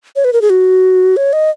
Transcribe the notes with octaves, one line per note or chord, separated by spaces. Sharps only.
C#5
B4
A#4
G#4
F#4
C#5
D#5